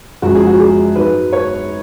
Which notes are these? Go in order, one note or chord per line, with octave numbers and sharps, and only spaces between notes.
F#2 F3 G#3 F#4
G#4
F#4
G#4
G#2 F#3 B4
C#5